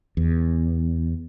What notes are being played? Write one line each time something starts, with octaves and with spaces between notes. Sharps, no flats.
E2